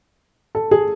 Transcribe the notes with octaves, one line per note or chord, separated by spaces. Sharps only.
A4
G#4